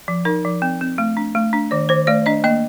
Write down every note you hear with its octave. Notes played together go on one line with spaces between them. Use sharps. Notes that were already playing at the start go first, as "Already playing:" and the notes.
F3
D#4 A#4
F3
C4
C4
A3
D4
A3
D4
D#3 D5
D#3 C5
A3 D5
D4 D#5
A#3 D#5